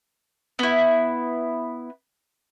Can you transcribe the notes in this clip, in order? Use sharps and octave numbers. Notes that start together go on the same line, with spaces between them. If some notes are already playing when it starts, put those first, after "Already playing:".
B3 E4